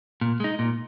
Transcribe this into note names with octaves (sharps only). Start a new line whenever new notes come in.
A#2
G#3 D#4
A#2